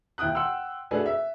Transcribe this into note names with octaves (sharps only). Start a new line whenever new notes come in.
D#2 E4 G5 D#6 F#6
F#5 G5 C6 E6
A3 D4 F#4 G#4 A4 B4
E5